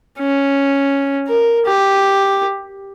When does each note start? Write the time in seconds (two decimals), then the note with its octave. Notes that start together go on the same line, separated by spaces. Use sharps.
0.19 C#4
1.28 A#4
1.66 G4